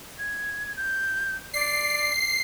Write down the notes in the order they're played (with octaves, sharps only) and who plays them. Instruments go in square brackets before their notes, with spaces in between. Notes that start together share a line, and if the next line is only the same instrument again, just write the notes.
[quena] G#6
G6
[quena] D5 [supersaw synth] C7